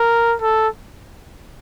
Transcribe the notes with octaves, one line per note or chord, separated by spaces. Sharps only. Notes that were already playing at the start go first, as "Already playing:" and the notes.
Already playing: A#4
A4